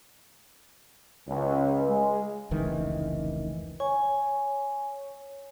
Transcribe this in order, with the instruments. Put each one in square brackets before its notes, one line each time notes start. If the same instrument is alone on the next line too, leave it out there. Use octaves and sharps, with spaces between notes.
[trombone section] C#2
G#3
[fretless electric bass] F1 C#2 D#3 E3
[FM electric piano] C#5 [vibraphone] G#5